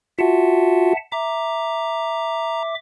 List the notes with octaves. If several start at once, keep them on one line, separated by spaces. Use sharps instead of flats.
F4 F#4 E5 F#5 A5
E5 A#5 D6